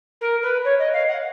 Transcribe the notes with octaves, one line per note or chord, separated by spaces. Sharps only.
A#4
B4
C#5
D#5
F5
F#5